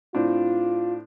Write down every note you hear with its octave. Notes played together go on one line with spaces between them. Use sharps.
A2 C4 D4 F4